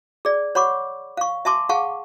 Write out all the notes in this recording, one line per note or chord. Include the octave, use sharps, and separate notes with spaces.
G#4 D5
C#5 F#5 B5 C#6 D6
F5 C#6
E5 G#5 A5 C6 D6
G#4 F5 F#5 A5 C#6